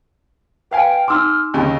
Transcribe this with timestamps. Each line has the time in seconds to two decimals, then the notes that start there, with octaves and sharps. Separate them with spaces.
0.71 B4 F5 G5 G#5
1.08 D#4 C6 D6 E6 F6
1.54 D#2 C#3 D#5